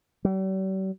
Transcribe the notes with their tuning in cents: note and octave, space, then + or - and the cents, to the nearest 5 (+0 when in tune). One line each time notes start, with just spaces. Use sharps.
G3 -45